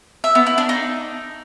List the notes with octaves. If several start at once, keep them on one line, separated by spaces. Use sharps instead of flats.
E5
B3
E4
D4
D#4